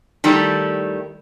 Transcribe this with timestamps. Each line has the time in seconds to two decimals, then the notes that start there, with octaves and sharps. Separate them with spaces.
0.24 D#3 G3 A3 E4